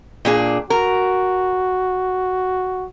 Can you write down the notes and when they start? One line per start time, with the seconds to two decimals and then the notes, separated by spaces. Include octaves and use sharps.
0.25 A#2 D4 G#4
0.70 F#4 A#4